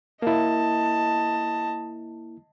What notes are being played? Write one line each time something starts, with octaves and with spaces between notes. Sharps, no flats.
A#3 E4 D#5 A5